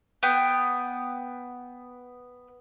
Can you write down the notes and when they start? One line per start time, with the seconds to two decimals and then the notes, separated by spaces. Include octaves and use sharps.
0.23 B3 G5